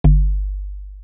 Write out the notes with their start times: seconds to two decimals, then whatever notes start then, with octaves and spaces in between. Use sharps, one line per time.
0.04 G1